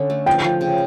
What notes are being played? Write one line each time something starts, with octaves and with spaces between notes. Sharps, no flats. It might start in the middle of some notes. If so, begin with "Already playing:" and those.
Already playing: D3 C#4
A3
F3 G5
F3
C#3